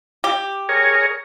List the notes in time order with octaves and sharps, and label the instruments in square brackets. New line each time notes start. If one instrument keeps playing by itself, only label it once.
[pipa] G4
[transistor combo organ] G#4 A#4 C#5